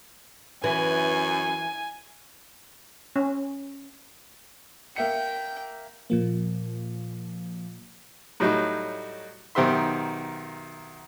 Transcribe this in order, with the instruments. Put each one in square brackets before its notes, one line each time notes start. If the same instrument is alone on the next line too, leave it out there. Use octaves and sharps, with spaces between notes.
[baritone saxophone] F#2 [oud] E3 [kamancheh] G#5
[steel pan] C#4
[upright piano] A#3 E5 C#7 [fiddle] G5
[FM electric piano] A#2 F3 A#3
[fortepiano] A2 F#3 G3 D#4
B1 D#3 G4 C5 E5 C6